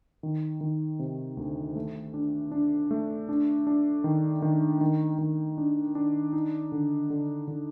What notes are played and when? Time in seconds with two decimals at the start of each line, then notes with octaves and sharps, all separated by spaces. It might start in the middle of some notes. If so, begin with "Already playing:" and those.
0.23 D#3
0.61 D#3
0.99 C3
1.37 D2
1.76 A3
2.14 D4
2.51 D4
2.91 A3
3.29 D4
3.67 D4
4.04 D#3
4.42 D#3
4.81 D#3
5.18 D#3
5.58 D4
5.95 D4
6.33 D#4
6.72 D3
7.10 D3
7.48 D3